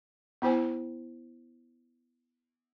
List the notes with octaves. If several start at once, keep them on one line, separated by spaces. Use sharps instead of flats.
B3 E4 C5 G#5